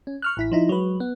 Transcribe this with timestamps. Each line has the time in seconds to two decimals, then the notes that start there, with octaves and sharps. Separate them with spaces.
0.07 C#4
0.22 C#6 F6 F#6
0.37 A1 E4 B6
0.52 F3 D#4 E4
0.69 F#3 G#3 B4
1.00 B3